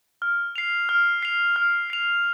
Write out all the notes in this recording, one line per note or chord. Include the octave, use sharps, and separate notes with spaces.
F6
C7 F7
F6
C7 F7
F6
C7 F7